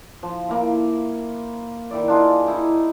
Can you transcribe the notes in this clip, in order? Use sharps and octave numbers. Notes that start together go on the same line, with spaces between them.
F3
A#3 E4
D#3 E4 D5
D4 F4 G#4
D#4 E4